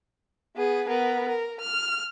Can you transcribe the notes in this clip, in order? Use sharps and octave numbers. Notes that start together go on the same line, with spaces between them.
B3 G#4
B3 A#4
A#4
F6